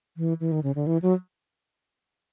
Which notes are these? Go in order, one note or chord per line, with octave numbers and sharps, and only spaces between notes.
E3
E3
D#3
C#3
D3
E3
F#3